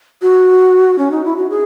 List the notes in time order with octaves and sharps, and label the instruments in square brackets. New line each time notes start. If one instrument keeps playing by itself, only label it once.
[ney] F#4
C#4
D#4
E4
F#4
G#4